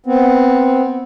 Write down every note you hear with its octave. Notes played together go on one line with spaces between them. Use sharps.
B3 C4